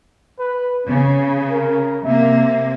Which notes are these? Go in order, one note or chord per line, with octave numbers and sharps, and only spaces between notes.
B4
C#3 C#4
A#4
C3 A#3 E5